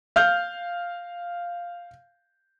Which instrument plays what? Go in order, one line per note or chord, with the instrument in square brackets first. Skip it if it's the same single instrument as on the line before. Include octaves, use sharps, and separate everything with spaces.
[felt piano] F5 F6 G6